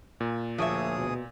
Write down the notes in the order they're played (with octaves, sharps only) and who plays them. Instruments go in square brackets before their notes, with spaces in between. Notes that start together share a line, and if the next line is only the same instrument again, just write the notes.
[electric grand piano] A#2
[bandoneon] D2 G#4 D#6 [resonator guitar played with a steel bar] F3 C#5 E5 [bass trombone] A#3
[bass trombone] B2